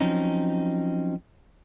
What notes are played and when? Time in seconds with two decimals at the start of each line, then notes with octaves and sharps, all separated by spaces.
0.01 F3 F#3 C4 C#4 D#4